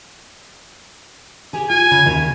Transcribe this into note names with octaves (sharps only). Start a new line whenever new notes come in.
G4 G#4 G#5
F4 G#5
C#3
D#2 C#3 G4